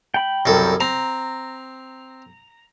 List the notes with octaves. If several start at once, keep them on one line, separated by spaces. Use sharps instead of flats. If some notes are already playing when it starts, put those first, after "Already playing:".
G5 B5
C2 F#2 A4
C4 A#5